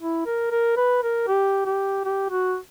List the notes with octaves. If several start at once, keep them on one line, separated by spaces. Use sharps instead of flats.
E4
A#4
A#4
B4
A#4
G4
G4
G4
F#4